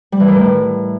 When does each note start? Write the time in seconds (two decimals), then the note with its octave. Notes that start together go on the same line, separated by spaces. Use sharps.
0.12 G3
0.20 E3
0.28 D#3
0.35 A2